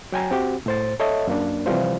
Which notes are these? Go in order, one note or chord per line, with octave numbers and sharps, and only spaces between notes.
F#3 G5 G#5 A#5
C4 F#4 G4
A2 C5 A6
A4 C#5 D#5 E5 A5
F#2 A#3 D4
C3 E3 F3 G3 F4 C5